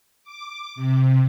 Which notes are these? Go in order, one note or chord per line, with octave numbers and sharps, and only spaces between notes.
D6
C3